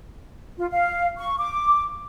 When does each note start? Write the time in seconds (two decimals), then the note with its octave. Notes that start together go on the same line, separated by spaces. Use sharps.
0.58 F4
0.72 F5
1.18 C#6
1.39 D6